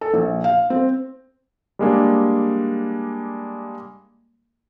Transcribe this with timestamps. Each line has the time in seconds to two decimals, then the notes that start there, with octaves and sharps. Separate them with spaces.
0.01 A4
0.14 A#1
0.44 F5
0.70 C4
1.79 G3 G#3 A#3 D4